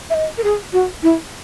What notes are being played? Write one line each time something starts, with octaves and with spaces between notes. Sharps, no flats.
E5
D#5
A#4
G#4
F#4
E4